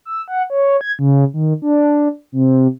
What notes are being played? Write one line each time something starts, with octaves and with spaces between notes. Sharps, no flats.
E6
F#5
C#5
G#6
C#3
D#3
D4
C3